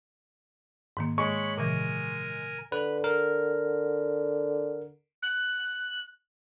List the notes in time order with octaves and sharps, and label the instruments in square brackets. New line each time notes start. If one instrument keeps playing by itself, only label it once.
[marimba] G#2 D#3 A#3
[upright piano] G#3 [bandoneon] C#5 B5 [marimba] D#5 [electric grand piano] C#6
[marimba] A#2 C#3 E3 [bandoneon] A#4 G#5
[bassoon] D3 [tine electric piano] B4
[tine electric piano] A#4
[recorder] F#6